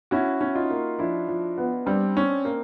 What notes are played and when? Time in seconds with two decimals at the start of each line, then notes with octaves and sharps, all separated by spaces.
0.11 C#4 E4 F#4
0.41 C#4
0.55 D#4 F4
0.71 A#3
0.99 F3 D4 E4
1.28 F3
1.58 B3
1.86 G3 C4 D4
2.17 C#4
2.45 A#3